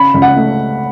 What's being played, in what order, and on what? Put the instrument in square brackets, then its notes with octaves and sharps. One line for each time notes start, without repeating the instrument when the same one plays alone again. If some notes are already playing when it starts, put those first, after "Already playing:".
Already playing: [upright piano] C#3 B5
C#2
F#5
A3